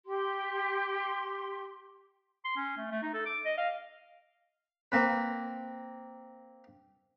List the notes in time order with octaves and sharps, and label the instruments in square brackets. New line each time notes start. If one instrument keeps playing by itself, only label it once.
[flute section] G4 C6
[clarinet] C6
C#4
A3
A3
D#4
A4
D6
D#5
F5
[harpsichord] A#3 C4 B4